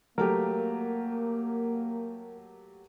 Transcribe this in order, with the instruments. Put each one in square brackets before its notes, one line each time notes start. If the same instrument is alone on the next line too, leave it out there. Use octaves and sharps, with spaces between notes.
[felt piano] F#3 A3 G4 [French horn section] A#3 [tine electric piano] A#4